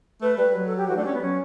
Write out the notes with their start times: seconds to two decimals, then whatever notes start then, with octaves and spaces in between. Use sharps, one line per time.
0.21 A3 B4
0.38 G3 B4
0.55 F#3
0.66 A4
0.77 G4
0.88 E3 F#4
0.97 A3 D4
1.04 G3 C#4
1.13 B3
1.21 F#3 C#4